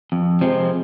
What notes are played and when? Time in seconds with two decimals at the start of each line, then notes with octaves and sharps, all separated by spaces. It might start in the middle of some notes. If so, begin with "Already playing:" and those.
0.12 F2
0.41 C3 F3 G#3 C4